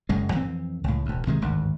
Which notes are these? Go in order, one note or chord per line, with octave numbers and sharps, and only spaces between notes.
F#1 F#2 G#3
F2 E3 C4
C#2 A2
E1 D2
C3 D#3 G#3
G#1 D2 G2